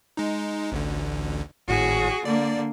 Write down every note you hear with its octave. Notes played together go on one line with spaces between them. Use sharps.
G#3 D#4
A1 D2 D3
G#1 A2 F#4 G#4
D3 A#3 D5